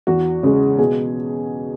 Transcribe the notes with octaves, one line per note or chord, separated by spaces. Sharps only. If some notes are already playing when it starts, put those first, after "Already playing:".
E2 F#4
C#3 G#3
B2 G#4